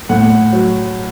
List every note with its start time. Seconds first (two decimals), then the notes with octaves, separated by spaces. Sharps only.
0.09 A2 F#5
0.53 F#3